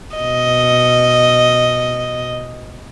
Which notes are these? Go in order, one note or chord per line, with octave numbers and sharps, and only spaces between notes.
B2 D#5